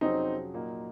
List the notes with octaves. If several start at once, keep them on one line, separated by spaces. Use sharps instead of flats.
F2 C3 F#3 C4 C#4 D#4 G#4
A#2 F#3 A#3 D#4